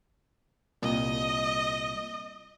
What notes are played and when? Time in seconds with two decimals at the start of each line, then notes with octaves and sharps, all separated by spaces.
0.82 C2 A#2 D#5